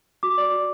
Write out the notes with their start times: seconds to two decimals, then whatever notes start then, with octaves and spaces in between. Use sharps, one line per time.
0.23 F#4 D6
0.38 D5
0.52 F#4